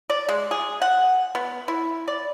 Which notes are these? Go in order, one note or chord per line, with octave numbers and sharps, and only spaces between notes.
D5
G#3
G#4
F#5
B3
E4
D5